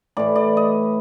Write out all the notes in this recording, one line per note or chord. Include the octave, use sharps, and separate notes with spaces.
A2 E3 D5
D5
D#5